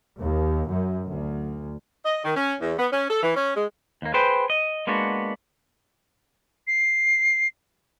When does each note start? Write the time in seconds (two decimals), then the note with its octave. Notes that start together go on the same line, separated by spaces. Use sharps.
0.18 D#2
0.67 F#2
1.07 D2
2.05 D#5
2.25 D#3
2.37 C#4
2.61 E2
2.79 B3
2.93 C#4
3.10 A4
3.23 E3
3.36 C#4
3.56 G#3
4.02 D#2 A#3
4.14 G#4 B4 C5 G5
4.50 D#5
4.87 G#3 A#3 B3 D4 F#4
6.67 C7